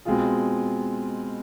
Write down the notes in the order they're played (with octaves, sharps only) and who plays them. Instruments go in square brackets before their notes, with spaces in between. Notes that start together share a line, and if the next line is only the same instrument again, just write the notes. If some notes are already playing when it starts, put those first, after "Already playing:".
[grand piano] B2 G#3 C4 F4 G#4